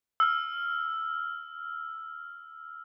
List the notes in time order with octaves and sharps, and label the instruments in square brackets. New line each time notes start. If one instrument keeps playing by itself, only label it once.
[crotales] E6 F6